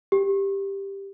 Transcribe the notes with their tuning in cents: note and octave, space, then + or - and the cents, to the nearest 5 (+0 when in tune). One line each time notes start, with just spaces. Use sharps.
G4 +5